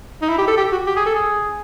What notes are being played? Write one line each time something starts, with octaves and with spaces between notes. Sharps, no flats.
D#4
E4
G4
A4
G4
F#4
G4
G#4
A4
G#4